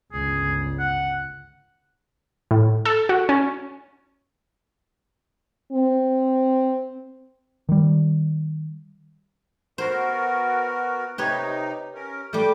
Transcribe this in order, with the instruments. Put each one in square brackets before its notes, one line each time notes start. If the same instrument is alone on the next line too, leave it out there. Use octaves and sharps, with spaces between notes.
[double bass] G1 C#2 [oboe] G#4
[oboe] F#5
[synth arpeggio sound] A2
A4
F#4
C#4
[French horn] C4
[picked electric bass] D#3 G3
[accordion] B3 F#4 A#4 [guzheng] C5
[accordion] C3 D#4 [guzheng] G4 B4 C#5
[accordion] C#4 A#4
[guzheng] G3 A3 [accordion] D6 G6